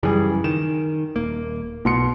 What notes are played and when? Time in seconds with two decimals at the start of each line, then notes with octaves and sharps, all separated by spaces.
0.03 F#2 C#3 E3 G3 G#4
0.44 D#3 E7
1.16 D#1 A#3
1.85 B1 B2 C6 C#7